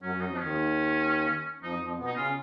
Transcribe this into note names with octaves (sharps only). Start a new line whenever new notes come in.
F#2 F#3 C#4
F#2 F#3
D#4
F2 F3
D#2 D#3 C#4
F2 F3 D#4
F2 F3
B2 B3
D#4
C#3 C#4 F4